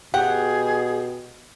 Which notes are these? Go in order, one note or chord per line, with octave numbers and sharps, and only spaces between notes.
B2 G4 G#4 F#5